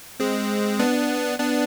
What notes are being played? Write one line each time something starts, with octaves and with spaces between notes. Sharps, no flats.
G#3 C4
B3 D4
B3 D4